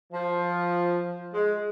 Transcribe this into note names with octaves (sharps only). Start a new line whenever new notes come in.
F3
G#3